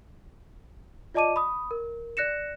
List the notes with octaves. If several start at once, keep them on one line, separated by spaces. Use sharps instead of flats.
F4 D5 D#5 A5 D6 D#7
B5 D#6
A#4
D5 F#6 A#6 C#7 E7